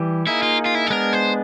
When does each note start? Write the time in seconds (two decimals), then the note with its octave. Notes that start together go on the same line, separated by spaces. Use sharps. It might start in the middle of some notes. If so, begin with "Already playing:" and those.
Already playing: E3 G3 G4
0.27 A#3 D#4 E4 G#4
0.43 F4
0.66 F4
0.75 E4
0.87 A4
0.90 G#3 B3 D4 A#4
1.13 C5